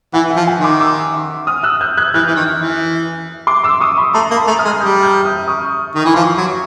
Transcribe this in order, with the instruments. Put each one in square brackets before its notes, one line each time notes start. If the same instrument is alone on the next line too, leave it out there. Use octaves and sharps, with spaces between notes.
[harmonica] E3 [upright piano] E5 F#5
[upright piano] E5 F#5
[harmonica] F3
[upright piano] F#5 G#5
[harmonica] D#3
[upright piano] C6 D6
D6 E6
D#6 F6
E6 F#6
F6 G6
F#6 G#6
[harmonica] E3 [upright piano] F6 G6
[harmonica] E3
D#3
E3
[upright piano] C6 D6
D6 E6
C#6 D#6
B5 C#6
[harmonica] A3 [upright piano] A#5 C6
[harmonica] A#3
[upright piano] A5 B5
[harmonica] A3
[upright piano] D#6 F6
[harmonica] G#3
[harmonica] G3 [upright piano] F6 G6
[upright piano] F6 G6
D#6 F6
C#6 D#6
[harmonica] D#3
[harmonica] E3 [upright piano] C#6
[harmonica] F3 [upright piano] C6 D6
[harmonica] F#3 [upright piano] B5 C#6